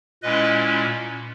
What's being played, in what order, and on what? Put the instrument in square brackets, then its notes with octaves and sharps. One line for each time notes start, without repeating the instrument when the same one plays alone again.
[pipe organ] A#2 G#3 C#4 E4 B4 D#5